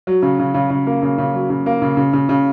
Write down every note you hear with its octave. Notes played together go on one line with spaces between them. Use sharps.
F#3
C#3
C#3
C#3
C#3
A#3
C#3
C#3
F#3
C#3
A#3
C#3
C#3
C#3
C#3